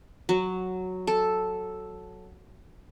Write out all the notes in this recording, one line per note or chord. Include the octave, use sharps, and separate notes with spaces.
F#3
A4